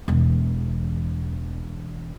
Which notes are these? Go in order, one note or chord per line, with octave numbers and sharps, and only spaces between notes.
E1 E2